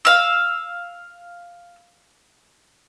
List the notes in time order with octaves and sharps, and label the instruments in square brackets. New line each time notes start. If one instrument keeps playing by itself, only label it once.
[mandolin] F5 E6